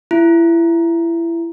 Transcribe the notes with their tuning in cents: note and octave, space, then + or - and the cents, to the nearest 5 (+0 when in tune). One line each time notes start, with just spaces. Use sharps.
E4 +25